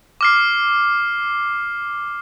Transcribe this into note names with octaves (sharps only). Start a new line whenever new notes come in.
D6 F6 C7